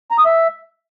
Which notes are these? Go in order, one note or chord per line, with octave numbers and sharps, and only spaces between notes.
A#5
D#6
E5